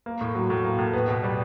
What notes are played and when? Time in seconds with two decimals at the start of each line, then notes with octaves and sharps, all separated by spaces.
0.06 A#3
0.21 A2
0.35 F#3
0.50 A2
0.64 A#3
0.79 A2
0.93 B3
1.08 B2
1.24 G3